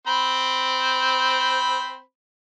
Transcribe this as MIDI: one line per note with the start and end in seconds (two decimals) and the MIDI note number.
0.07 2.01 60
0.07 2.01 72
0.07 2.01 83